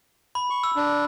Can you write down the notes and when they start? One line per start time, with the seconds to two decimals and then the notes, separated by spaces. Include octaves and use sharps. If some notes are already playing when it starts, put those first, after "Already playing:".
0.35 B5
0.50 C#6
0.64 E6
0.76 D4